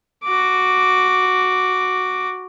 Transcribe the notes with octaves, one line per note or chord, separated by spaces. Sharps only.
F#4 D6